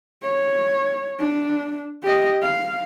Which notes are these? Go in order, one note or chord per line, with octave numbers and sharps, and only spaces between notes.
C#5
D4
G4 D#5
F5